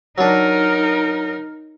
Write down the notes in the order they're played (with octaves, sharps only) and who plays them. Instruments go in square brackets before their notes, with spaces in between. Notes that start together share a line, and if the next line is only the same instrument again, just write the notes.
[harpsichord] F#3 D4 [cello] D#4 A#4